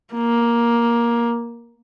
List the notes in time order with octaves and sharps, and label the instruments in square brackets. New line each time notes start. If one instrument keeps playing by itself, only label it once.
[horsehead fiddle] A#3